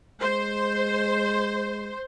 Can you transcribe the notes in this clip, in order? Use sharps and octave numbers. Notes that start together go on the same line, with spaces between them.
G#3 C5